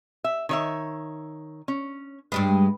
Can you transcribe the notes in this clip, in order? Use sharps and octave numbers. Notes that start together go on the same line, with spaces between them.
E5
D#3 C#5 E5
C#4
G2 G3 G#3 B4